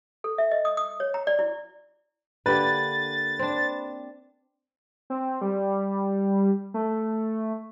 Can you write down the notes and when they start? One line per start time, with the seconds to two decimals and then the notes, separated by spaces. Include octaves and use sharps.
0.24 A4
0.38 E5
0.51 D#5
0.65 D#6
0.77 D#6
1.00 C#5
1.14 A#5
1.27 D5
1.39 E4
2.46 D3 A#3 G4 B4 A6
3.39 C4 D4
5.10 C4
5.41 G3
6.74 A3